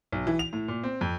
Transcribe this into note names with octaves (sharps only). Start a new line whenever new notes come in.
B1
E3
F7
A2
A#2
C4
F2